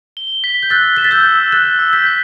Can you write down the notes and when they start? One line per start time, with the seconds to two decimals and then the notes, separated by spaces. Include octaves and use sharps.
0.17 G7
0.44 B6
0.63 G6
0.70 E6 F#6 A6
0.97 B6 E7
1.04 A6
1.11 E6 G6
1.24 E6
1.52 F#6 A6 E7
1.79 E6
1.93 G6 B6
2.06 B6